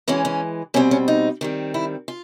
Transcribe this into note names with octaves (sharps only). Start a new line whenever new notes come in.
E3 G#3 C#4 F#4
C#4
B2 G3 C4 C#4
C#4
D#4
D#3 G3 C4
E4
F4